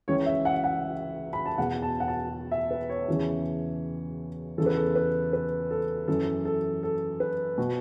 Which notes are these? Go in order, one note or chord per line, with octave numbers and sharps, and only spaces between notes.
C#2 C#3 E3 C#5
E5
F#5
F#5
B5
A5
E2 B2 F#5
A5
F#5
A5
E5
B4
C#5
E2 C#3 E3
E2 C#3 E3 A4
B4
A4
B4
B4
A4
F#2 E3 A4
A4
A4
B4
B2 F#4